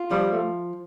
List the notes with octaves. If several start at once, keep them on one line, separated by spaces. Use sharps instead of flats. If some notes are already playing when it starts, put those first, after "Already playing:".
Already playing: F4
F3 G3
A3